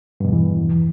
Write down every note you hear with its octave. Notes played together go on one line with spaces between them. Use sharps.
E2 G2 B2 E3